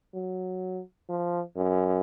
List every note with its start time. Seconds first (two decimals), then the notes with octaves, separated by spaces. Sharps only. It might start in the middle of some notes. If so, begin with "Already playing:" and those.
0.15 F#3
1.09 F3
1.56 F#2